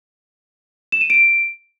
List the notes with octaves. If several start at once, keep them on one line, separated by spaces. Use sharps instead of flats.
E7
D#7
D7